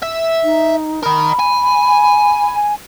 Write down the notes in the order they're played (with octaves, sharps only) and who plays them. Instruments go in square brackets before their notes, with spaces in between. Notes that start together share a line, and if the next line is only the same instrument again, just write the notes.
[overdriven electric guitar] E5
[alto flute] D#4
[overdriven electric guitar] A#4 D#5 [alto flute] B5
[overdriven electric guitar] G#5